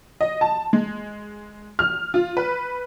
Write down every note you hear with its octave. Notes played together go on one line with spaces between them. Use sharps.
D#5
A5
G#3
F6
F4
B4